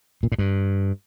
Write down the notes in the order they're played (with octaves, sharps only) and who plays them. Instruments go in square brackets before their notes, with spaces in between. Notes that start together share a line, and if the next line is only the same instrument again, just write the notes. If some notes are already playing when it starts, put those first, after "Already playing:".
[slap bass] A#2
A2
G2